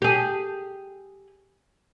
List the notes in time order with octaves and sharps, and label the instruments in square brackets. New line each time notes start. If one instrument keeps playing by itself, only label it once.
[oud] G4 G#4